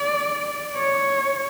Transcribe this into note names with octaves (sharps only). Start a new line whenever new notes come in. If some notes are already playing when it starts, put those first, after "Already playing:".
Already playing: D5
C#5